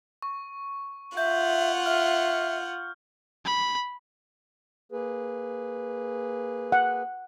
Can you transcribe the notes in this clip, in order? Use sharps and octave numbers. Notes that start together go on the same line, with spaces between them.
C#6
F4 E5 F#5 G6
E5 F6
B5
A#3 G#4 B4
F#5